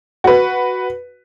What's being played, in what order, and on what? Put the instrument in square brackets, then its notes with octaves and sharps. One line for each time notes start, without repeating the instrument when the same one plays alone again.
[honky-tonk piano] F#4 B4